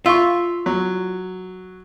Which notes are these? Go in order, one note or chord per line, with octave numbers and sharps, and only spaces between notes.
F4 E5 C#6
F#3